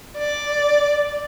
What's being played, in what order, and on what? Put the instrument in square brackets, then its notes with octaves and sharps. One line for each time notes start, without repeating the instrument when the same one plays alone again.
[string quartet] D5